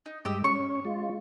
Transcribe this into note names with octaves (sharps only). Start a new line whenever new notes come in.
D#4
G2 G#3 G4 D#5 E5
C#4 C#6
G#3 F4